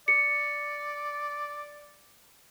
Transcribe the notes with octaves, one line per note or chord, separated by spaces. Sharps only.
D5 C#7